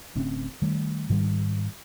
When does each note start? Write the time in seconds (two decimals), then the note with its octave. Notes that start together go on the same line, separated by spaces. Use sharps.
0.15 D1 D2 C4 C#4
0.62 D#3 G3 A3
1.10 G#2 D#3 G3